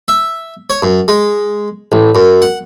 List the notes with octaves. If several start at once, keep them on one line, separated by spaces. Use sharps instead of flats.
E5
C#5
F#2
G#3
A1
F#2
F#5